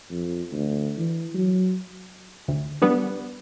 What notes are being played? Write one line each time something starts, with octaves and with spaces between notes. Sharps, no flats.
F2
D2
E3
F#3
D2
G3 B3 D4